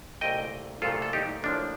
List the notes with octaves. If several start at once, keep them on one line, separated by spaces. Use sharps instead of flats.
C2 A#2 A3 D#5 G5
C2 A#2 A3 F4 A4
A4
D#4 G4
A1 A2 F3 A#3 D4